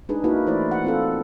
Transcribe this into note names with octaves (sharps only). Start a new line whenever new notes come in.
G#3 D4 D#4 G#4 B4
A#3 D#4 E4 F#4 A#4 B4
E3 A3 E4 C5 D5
F#5
C4 F4 A4